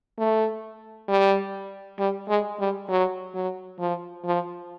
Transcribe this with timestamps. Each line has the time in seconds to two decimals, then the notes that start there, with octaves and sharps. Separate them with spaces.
0.18 A3
1.09 G3
1.99 G3
2.29 G#3
2.59 G3
2.89 F#3
3.34 F#3
3.79 F3
4.25 F3